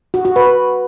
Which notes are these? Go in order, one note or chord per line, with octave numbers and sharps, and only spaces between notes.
F#4
F#4
B4